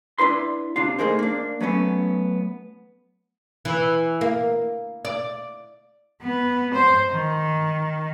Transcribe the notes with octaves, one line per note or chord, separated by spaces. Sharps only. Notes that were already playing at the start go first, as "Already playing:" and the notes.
D4 E4 B4 C6
C3 D4 F4
A3 A#3 D#4 G#4 A#4 C5
A#3 D4
F#3 A3 B3 C#4
E3
A#3
D5
B3
C5
D#3